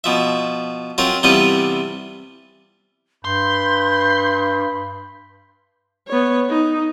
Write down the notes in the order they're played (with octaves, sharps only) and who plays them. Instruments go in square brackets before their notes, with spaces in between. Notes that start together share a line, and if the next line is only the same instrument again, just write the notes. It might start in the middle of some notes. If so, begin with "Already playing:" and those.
[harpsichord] B2 F3 E5
F#3 C4 F4 A#4
C3 E3 G3 B3 F4 B4
[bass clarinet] G2 [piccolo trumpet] B5 [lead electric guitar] C6 [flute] G6
[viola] B3 C#5
D#4